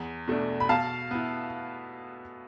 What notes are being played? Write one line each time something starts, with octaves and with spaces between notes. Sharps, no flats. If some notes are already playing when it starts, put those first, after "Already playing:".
Already playing: E2
B2 A3 D4
B5
B2 F5 A5
B3 E4